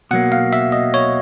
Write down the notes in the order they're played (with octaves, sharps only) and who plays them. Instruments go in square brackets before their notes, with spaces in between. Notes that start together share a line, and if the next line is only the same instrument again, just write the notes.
[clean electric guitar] B2 F#3 A#3 [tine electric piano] F#5
[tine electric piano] F5
E5
D#5
C#5